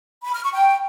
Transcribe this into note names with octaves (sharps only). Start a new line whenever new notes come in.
B5
F6
C#6
G5